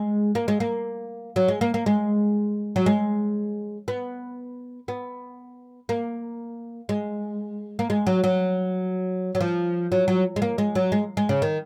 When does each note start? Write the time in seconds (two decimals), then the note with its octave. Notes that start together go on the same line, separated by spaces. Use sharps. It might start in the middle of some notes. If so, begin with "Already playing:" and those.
Already playing: G#3
0.35 A#3
0.48 G#3
0.60 A#3
1.36 F#3
1.48 G#3
1.61 A#3
1.74 A#3
1.86 G#3
2.76 F#3
2.86 G#3
3.88 B3
4.88 B3
5.89 A#3
6.89 G#3
7.79 A#3
7.90 G#3
8.07 F#3
8.24 F#3
9.35 F#3
9.41 F3
9.92 F#3
10.08 F#3
10.36 G#3
10.42 A#3
10.58 G#3
10.75 F#3
10.92 G#3
11.17 G#3
11.29 C#3
11.42 D#3